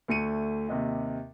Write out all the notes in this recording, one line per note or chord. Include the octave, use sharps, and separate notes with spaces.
D2 A3 C#7 D#7
D#2 C3 D#5